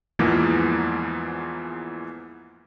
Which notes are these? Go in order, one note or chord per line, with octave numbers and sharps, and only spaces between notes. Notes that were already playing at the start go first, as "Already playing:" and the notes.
E2 G#2 E3 F3 A#3 B3